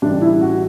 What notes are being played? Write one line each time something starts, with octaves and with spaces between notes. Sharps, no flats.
A1 A2 G3 D4
E4
F#4